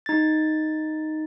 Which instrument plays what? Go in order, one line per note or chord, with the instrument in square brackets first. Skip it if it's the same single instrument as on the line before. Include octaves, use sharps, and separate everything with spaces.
[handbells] D#4 A6